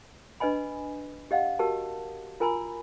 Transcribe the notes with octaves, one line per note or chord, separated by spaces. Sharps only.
D4 B4 D#5 G#5 B5
G4 D#5 F5 F#5
F#4 G4 A#4 A5
F4 A#4 G#5 A#5 B5